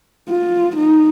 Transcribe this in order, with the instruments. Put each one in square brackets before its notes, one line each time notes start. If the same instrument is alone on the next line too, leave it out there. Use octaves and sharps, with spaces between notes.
[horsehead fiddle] F4
D#4